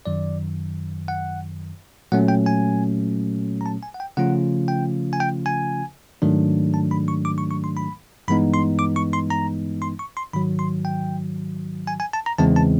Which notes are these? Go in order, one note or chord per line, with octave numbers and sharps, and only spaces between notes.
F#2 D#3 F#3 D5
F#5
A#2 F#3 A3 C#4 F#5
G5
G#5
A#5
A5
G#5
F#5
G5
C#3 F3 A3 C#4 F4 F#5
G5
G#5
G5
G#5
G#2 D#3 F#3 A3 D4
A5
B5
C#6
D6
C#6
C#6
C6
B5
G2 E3 G#3 B3 D#4 B5
C6
D6
C#6
C6
A#5
C6
C#6
C6
G#2 D#3 F#3 B5
C6
G5
G#5
G#5
A5
A#5
E2 C#3 E3 G#3 C4 A5
A5